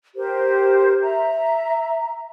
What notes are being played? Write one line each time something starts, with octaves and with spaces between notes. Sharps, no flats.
G4 A#4 C5
E5 A#5